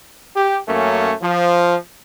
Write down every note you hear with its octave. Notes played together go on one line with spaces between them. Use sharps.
G4
F#2 A3 A#3 C#4
F3